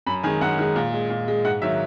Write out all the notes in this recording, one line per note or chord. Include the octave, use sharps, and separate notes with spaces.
F#2 B5
D#3 G#3 G#5
F#2 F#5
D#3 G#3
A#2
G#3
A#2
G#3
G#2 F#5
D#3 F#3 E5